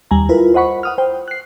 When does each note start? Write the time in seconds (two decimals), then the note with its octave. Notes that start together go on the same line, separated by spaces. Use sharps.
0.11 D#2 G3 G#5 A#5
0.29 E4 F4 A#4 B4
0.54 C5 D#5 F#5 B5 C#6
0.83 F#5 D#6 F6
0.98 C5 G5
1.28 F#6 C7